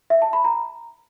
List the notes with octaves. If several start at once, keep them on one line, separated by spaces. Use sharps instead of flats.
E5
A5
B5
A#5